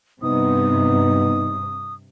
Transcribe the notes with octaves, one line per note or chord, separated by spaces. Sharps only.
G2 C3 B3 D#4 D#6